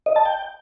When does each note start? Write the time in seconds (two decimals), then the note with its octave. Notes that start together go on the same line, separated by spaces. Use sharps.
0.06 D#5
0.16 A5
0.25 G5